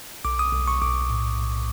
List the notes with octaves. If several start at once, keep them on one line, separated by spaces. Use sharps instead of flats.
B1 D6
D#6
B1
C#6
B1 D6
A2
B1